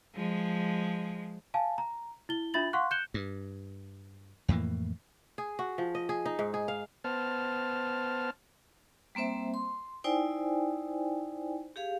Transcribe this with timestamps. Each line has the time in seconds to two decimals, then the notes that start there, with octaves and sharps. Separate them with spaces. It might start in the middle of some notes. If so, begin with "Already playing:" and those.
0.15 F3 G#3
1.54 F5 G#5 A5
1.78 A#5
2.29 E4 G7
2.54 D4 F4 E5 B5 A6 F#7
2.73 F5 F#5 C6 C#6 F#6
2.91 F#6 G6 C#7 E7 G7
3.14 G2
4.48 F2 A2 E3 A#3
5.38 G#4
5.59 F#4
5.78 F3
5.95 D#5
6.09 G#4
6.26 D#4
6.39 G#2
6.54 G#4
6.68 F5
7.04 B3 C5 A5 F6
9.15 G3 A#3 C4 C5 E5
9.54 C6
10.04 D#4 E4 C5 D5 G5 G#5
11.76 G4 G#4 F5